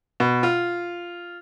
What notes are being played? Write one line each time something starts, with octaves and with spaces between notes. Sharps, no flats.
B2
F4